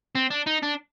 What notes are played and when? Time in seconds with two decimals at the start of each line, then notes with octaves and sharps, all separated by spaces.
0.15 C4
0.30 D4
0.46 D#4
0.62 D4